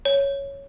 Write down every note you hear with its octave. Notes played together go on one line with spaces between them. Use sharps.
C#5